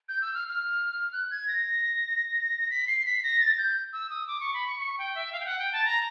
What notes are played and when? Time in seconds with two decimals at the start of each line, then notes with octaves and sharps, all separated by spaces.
0.09 G6
0.22 E6
0.34 F6
0.48 F6
1.13 F#6
1.31 G#6
1.48 A#6
2.70 B6
2.87 C7
3.06 B6
3.23 A#6
3.40 A6
3.58 G6
3.93 E6
4.10 D#6
4.28 D6
4.40 C#6
4.54 B5
4.67 C#6
4.80 C#6
4.98 G5
5.15 E5
5.32 F5
5.40 G5
5.46 F#5
5.59 G5
5.73 A5
5.85 A#5